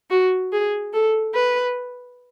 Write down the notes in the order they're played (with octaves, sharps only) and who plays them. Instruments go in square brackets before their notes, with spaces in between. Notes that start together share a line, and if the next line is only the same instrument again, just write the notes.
[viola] F#4
G#4
A4
B4